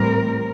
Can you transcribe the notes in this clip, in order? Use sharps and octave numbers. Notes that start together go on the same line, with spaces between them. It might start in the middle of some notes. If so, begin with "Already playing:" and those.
Already playing: A2 E3 G3 C4 A#4